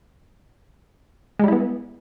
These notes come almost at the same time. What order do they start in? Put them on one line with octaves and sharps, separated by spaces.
G#3 G3 E4 B3